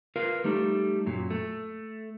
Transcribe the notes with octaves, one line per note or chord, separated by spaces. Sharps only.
F4 A#4 B4 F5
G3 A3 D#4 A4
F#2 A#2 F#3
A3